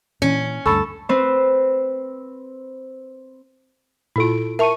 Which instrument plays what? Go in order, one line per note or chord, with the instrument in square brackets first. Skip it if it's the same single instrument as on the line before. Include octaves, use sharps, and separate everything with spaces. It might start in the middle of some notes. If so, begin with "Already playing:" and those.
[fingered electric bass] A#2 E3 [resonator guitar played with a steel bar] C#4
[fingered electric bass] D2 G2 [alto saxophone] A4 [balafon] B5 C#6
[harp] C4 B4 C5
[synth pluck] A#2 A4 D7 [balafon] E4 F4
[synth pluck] A#4 C#6 D#7 [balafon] E5 A5